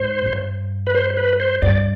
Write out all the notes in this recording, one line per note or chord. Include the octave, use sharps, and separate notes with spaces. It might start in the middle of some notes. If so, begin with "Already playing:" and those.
Already playing: G#2 C5
G2
B4
C5
B4
C5
G2 D5